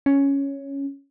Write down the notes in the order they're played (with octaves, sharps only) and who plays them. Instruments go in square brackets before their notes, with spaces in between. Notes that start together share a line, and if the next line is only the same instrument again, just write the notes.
[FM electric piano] C#4